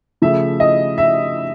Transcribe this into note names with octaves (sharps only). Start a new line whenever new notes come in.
C#3 F3 A3 E5
D#5
E5